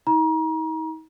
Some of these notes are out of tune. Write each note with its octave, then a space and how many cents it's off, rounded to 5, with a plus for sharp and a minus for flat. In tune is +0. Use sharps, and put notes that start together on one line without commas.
D#4 +40 A#5 +35